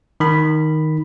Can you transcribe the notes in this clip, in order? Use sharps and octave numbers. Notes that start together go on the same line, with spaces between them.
D#3 B5